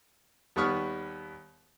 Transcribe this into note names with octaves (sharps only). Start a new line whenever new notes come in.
D#2 G3 B3 C#6 D#6 F6